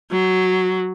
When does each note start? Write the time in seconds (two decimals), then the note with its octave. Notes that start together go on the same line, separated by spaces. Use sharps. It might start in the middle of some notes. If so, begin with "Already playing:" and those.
0.11 F#3